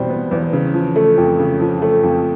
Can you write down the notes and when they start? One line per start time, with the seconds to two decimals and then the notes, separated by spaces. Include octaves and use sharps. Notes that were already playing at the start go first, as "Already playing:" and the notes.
Already playing: E2 B2 G3 C4 C5
0.10 B3
0.31 E2
0.53 C#3
0.74 F3
0.96 A3
1.17 F2
1.39 C#3
1.60 F3
1.82 A3
2.03 F2